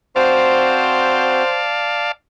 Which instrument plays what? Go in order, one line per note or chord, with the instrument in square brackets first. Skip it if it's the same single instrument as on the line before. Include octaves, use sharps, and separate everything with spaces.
[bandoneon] C4 F#4 [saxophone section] C5 [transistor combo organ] D5 F5 A5